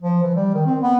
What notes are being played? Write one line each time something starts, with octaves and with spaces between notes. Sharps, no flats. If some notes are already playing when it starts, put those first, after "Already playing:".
F3
E3
G3
D#3
C4
B3